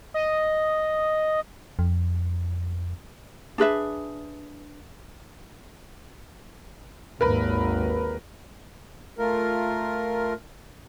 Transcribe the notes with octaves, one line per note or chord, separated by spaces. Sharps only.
D#5
F2
D4 G#4 B4 E5
G#1 D#2 A#4 B4
A3 F4 A#4